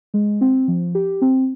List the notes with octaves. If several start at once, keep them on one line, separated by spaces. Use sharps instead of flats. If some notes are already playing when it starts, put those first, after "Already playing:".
G#3
C4
F3
G4
C4